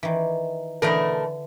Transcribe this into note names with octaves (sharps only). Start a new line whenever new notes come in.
D#3 E3
B2 D3 E3 A3 A#4